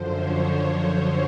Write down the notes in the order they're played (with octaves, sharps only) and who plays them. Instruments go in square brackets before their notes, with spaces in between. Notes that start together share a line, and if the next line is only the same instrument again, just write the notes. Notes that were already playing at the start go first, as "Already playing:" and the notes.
Already playing: [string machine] F#2 D3 F3 C5
C#5
C5